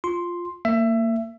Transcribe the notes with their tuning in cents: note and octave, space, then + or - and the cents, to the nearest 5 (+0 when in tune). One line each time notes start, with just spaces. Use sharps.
F4 +0 C6 +0
A#3 -25 E5 +20